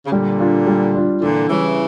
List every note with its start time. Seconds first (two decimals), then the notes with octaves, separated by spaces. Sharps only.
0.06 C#3
0.12 A#2 D3 G3
0.39 D4 F4
0.67 G3
0.94 D4 F4
1.21 A#2 D3 E3
1.49 C#3 E3 G3 C#4